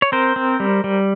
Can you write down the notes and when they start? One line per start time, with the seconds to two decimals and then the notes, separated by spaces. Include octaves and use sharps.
0.02 C#5
0.12 C4 A#4 C5
0.36 C4
0.60 G3
0.84 G3